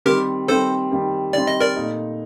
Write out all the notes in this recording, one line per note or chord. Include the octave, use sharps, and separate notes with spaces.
D#3 G3 C4 G4 A#4
D#3 G3 C4 A4 C5
D#3 G3 C4
D#3 G3 C4 D5
D#5
A#4 D5
A#2 A3 D#4